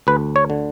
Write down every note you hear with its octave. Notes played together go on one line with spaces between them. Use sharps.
D2 B4
C#5
D3